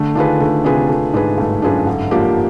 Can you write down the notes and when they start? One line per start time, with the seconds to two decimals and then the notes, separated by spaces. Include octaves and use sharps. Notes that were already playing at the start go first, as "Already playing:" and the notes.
Already playing: D3 A3
0.15 D#3 D4 F4 G#4 B4
0.40 D3 A3
0.64 C3 D4 F4 G#4 B4
0.88 A3
1.13 G#2 D4 F4 G#4 B4
1.37 G2 A3
1.62 F#2 D4 F4 G#4 B4
1.87 D3
2.11 F3 A#3 D4 G4